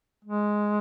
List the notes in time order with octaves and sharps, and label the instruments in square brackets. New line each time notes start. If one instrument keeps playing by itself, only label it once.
[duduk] G#3